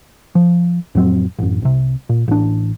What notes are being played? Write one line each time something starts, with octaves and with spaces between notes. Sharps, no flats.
F3
F2 A2 F#3 C4
A1 F#2
C2 C3
A#2
A1 D4